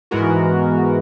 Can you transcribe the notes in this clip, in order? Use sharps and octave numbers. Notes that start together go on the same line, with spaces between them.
G#2 E3 G#3 B3 F#4 A#4